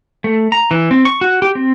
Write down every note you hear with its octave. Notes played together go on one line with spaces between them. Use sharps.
A3
A#5
E3
C4
C#6
F#4
G4
C4